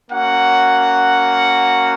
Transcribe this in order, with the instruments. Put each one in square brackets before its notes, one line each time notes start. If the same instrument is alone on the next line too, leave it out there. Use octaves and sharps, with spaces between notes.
[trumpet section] A#3 C#4 F#4 F#5